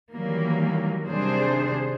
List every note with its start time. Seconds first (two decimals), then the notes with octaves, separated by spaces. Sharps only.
0.14 D#3 E3 F#3 G3 A#3
1.07 C3 D#3 G3 D4 G#4 C5